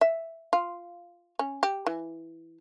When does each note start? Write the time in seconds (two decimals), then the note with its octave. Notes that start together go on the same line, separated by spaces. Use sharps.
0.01 E5
0.53 F4
1.39 C#4
1.63 G4
1.87 E3